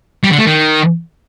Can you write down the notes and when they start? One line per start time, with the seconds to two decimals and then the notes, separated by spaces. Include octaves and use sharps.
0.24 G3
0.31 D3
0.38 A3
0.46 D#3